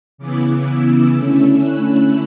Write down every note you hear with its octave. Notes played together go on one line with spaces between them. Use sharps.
C#3 E3 B3 E4 D6
E6
D3 A3 C#4 E4
F#6